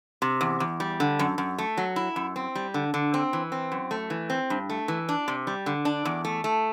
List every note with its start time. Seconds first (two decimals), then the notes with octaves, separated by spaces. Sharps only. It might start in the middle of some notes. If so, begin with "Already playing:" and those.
0.22 C3
0.41 E2
0.60 E2
0.80 G3
1.00 D3
1.19 F#2
1.38 F#2
1.58 A3
1.77 F#3
1.96 E4
2.16 F#2
2.36 C4
2.55 G3
2.74 D3
2.94 D3
3.14 C4
3.33 E3
3.52 C4
3.72 F#2
3.91 A3
4.10 E3
4.30 C4
4.50 G2
4.70 A3
4.88 E3
5.09 D4
5.28 C3
5.47 G3
5.66 D3
5.85 D4
6.05 E2
6.25 A3
6.44 A3